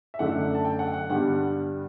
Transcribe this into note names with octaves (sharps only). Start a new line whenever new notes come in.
E5
F#2 D3 A3 D4 F#5
A5
G5
F#5
F#5
G2 D3 G3 B3 F#5